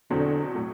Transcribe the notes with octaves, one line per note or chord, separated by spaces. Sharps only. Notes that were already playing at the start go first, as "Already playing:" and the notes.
E2 B2 D3 F#3 C4
A2 F#3